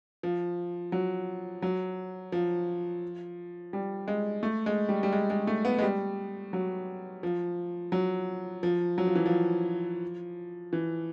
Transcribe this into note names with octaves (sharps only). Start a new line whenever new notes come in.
F3
F#3
F#3
F3
G3
G#3
A3
G#3
G3
G3
G#3
G#3
A3
B3
G#3
G3
F#3
F3
F#3
F3
F#3
F3
E3
F3
E3